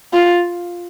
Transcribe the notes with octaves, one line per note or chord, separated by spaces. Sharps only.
F4